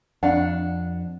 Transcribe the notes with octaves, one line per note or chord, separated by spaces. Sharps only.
F2 D4 F5 F#5